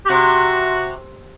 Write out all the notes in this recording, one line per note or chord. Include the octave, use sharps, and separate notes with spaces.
G4
C3 F#4